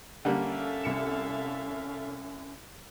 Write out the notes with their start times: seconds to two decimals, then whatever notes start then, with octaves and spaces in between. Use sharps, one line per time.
0.25 D3 G3 A#3 C#4 A4 E5 F5
0.83 C2 C#7 E7